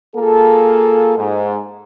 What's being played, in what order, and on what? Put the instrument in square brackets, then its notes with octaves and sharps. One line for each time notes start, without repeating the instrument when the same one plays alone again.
[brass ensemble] A#3 F4 G#4 A4
G#2